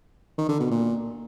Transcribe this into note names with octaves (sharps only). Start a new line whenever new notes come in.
D#3
D3
B2
A#2